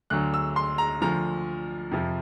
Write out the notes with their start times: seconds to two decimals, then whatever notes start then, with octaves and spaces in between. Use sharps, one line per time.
0.10 D2 D3 F#3 F#6
0.34 E6
0.56 C6
0.78 A#5
1.01 D2 D3 F3 A#5
1.91 F2 C3 F3